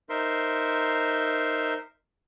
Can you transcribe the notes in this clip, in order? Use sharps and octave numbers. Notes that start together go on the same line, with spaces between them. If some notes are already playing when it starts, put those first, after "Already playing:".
D#4 A#4 C5 E5 C6